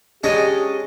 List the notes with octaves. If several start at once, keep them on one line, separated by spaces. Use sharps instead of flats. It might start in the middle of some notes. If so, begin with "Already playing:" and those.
G#3 C#4 D4 G4 C#5 D#5 A#5